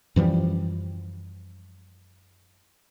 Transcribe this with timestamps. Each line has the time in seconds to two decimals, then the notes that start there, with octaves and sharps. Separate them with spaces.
0.16 F#2 E3 F3 G3